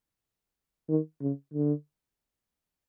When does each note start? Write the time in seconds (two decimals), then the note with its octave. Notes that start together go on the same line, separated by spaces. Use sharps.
0.89 D#3
1.21 C#3
1.54 D3